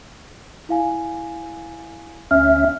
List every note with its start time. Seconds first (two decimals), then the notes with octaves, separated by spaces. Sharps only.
0.69 E4 F5 G#5
2.31 D2 C#4 E5 F6